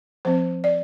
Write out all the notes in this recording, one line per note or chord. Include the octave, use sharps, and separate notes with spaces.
F3 C4 C5
D5